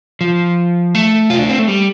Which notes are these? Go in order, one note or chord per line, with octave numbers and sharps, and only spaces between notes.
F3
A3
F4
D4
C4
A3
G3